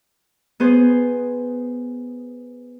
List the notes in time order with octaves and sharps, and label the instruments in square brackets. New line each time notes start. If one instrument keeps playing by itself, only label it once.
[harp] B3 G#4 C5